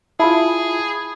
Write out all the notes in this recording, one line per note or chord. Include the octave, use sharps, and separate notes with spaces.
E4 F4 G#4 A5 B5